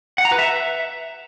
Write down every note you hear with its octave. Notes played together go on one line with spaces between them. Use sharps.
F#5
A#5
B4
E5